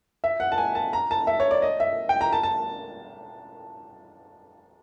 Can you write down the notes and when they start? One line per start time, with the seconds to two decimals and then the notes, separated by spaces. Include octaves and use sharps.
0.24 E5
0.40 F#5
0.52 A5
0.58 G#5
0.75 A5
0.93 A#5
1.11 A5
1.27 E5
1.40 C#5
1.51 D5
1.62 D#5
1.80 E5
2.09 G5
2.21 A#5
2.33 A5
2.43 A5